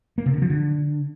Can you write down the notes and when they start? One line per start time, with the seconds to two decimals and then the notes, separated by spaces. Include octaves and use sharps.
0.18 A#3
0.26 C3
0.34 D3
0.42 F3
0.50 D3